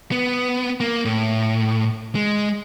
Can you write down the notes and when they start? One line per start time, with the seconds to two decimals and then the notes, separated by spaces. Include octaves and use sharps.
0.12 B3
0.80 A#3
1.05 A2
2.15 G#3